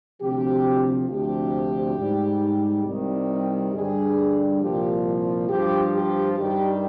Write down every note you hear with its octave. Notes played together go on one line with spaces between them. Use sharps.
D2 C3 F3 G4
D2 C3 F3 G4
G#2 G3
C2 C3 D#3 G3
G2 D3 G3 G#4
C2 A#2 F3 G4
G2 F3 G4
G4
G2 D#3 G3 G4